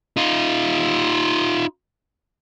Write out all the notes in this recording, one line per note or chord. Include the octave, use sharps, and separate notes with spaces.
D#4 F4